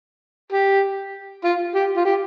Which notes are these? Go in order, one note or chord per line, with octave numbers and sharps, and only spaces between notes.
G4
F4
G4
F4
G4